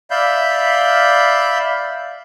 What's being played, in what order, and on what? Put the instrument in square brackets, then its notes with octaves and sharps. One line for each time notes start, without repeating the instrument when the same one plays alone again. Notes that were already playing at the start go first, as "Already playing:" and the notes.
[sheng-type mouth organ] D5 E5 F5 B5 G6